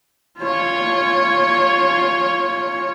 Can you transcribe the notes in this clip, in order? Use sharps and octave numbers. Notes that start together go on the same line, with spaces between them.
F4 C#5